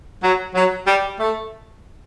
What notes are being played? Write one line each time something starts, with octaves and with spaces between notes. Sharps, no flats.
F#3
F#3
G3
A3